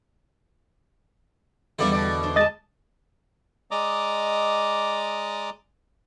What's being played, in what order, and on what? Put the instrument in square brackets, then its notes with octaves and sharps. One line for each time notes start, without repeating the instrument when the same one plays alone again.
[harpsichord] E2 D3 E4 [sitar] D#3 A#3 D5 [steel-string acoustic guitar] G3 A4
[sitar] B2 D5
[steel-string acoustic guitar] D4 C5
[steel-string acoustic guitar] G#3 G#4 A5 [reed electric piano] D#5 A6
[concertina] G#3 D5 D#5 A#5 D6 D#6